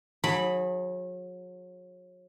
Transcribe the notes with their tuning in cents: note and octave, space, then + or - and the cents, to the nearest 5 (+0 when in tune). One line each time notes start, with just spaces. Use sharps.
F#3 -35 G#4 +0 B5 +0